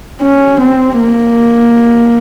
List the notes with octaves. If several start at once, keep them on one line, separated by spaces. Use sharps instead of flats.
C#4
C4
A#3